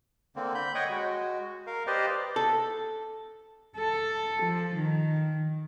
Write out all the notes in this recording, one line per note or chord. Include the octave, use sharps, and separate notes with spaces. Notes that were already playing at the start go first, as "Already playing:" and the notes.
D3 A#3 C4
B5 G6
C#5 D#5 F#5 G5 C#6 D#6
G#3 F#4
A#4 F5
G4 B4 C5 D5 D#5 F5
A4
A4
F3
D#3